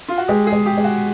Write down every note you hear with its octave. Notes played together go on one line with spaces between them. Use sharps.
F4
F#4
G#3 G4
G#4
G#3
G4
G#3
F#4